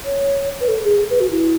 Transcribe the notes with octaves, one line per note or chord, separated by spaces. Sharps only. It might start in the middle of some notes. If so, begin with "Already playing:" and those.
C#5
B4
A4
G#4
B4
F#4
E4